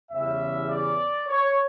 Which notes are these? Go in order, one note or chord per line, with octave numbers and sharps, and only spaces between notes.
E2 C#3 E3 G3 C#4 E5
D5
C#5